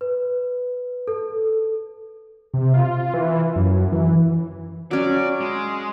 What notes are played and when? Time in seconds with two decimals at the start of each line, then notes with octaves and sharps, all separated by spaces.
0.01 B4
1.08 A4
2.54 C3
2.74 F4
3.14 E3
3.56 F#2
3.92 E3
4.91 F#3 C#4 D5
5.40 G#3